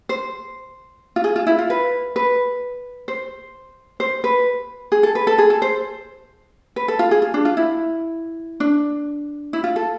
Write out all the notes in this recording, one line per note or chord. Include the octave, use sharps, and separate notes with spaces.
C5
F4
G#4
F4
E4
F4
B4
B4
C5
C5
B4
G#4
A4
B4
A4
G#4
A4
C5
B4
A4
F4
G#4
F4
D4
F4
E4
D4
E4
F4
A4